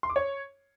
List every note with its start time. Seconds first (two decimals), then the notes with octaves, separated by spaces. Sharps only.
0.03 C6
0.10 D6
0.16 C#5